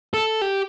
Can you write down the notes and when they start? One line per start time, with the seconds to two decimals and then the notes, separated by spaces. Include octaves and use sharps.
0.14 A4
0.42 G4